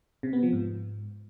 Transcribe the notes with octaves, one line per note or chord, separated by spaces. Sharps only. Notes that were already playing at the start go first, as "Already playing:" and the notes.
C3
B3
F3
G#2